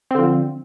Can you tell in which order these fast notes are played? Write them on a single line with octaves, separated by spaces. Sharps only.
C4 D3 F3